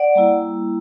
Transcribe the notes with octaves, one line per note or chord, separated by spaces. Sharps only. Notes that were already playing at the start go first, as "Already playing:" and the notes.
Already playing: D5 F#5
G3 A#3 E4